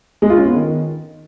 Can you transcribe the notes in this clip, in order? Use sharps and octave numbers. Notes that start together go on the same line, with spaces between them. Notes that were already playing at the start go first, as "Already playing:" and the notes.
G#3
F4
C#4
B3
D#3